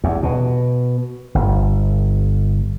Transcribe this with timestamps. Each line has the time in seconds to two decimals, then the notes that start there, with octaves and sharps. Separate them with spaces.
0.04 E2
0.23 B2
1.35 G1